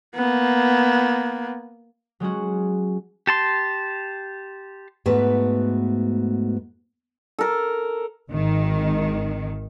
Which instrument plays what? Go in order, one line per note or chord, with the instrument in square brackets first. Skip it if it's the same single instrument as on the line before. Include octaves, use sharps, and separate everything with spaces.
[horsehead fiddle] A#3 B3
[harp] F#3 G#3 C#4 F#4
[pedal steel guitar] G4 A5 C6
[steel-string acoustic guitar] G#2 A3 B3 F#4 B4
[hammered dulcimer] A4 A#4
[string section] G#1 D#3